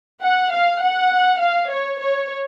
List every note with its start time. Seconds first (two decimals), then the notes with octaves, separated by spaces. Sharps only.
0.22 F#5
0.52 F5
0.81 F#5
1.40 F5
1.70 C#5
1.99 C#5